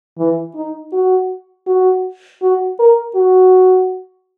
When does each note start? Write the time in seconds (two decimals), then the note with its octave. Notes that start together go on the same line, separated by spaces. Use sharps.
0.18 E3
0.55 D#4
0.93 F#4
1.67 F#4
2.42 F#4
2.79 A#4
3.16 F#4